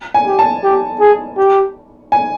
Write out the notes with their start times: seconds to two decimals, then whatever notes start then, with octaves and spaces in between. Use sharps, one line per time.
0.14 G#5
0.26 G4
0.39 A5
0.63 G4
1.01 G#4
1.37 G4
2.12 G#5